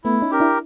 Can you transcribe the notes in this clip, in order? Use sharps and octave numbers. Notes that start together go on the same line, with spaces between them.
A3 B3 E4
C#4 D#4
G4 A#4
D4 E4